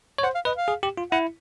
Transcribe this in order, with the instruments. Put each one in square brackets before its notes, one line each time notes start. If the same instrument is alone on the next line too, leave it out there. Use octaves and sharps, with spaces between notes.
[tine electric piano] C#5
[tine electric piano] C5 [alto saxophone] F#5
[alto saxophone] F5
[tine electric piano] B4 [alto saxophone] D#5
[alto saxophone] F5
[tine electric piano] G#4
G4
F4
[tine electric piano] E4 [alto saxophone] F#5